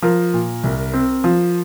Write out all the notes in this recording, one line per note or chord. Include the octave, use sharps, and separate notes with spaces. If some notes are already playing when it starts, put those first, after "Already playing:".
F3 A#4
A#2
C2
C4
F3